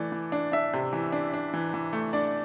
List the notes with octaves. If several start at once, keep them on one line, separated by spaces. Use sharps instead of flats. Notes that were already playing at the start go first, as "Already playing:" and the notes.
Already playing: E3 A3 D5
E3
D4
D4 E5
C3
E3
D4
D4
E3
E3
A3
D4 D5